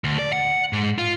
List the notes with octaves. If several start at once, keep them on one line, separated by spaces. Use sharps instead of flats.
D2
D5
F#5
G#2
F4